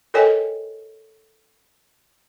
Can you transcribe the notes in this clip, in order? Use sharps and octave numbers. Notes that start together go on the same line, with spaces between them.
A4 A#4 C#5 D#5 G5 G#5